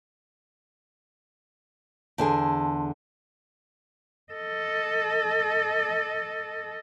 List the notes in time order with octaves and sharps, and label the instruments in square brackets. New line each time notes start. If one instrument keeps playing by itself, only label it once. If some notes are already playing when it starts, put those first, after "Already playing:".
[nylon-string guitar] E2 D3 G#4 [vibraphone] A5 C6
[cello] A4 D#5